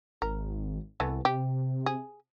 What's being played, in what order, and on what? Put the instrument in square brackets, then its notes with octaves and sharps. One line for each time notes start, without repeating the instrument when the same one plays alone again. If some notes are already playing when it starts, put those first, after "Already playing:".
[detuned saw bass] G#1 [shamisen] A#4
[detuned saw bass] C2 [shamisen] E3 A3 B3
[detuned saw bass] C3 [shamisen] G4
[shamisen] G#4